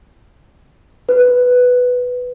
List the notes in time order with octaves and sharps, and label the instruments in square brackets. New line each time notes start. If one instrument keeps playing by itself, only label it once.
[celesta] B4